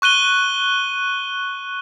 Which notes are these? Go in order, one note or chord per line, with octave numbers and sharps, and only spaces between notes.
C#6 F#6 D#7 G7